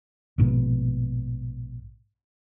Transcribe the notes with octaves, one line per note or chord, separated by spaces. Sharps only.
A#1 G#2 B2